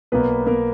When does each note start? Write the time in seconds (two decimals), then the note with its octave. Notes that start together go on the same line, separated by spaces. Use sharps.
0.12 B1 B2 A#3 B3 B4
0.47 A#3 A#4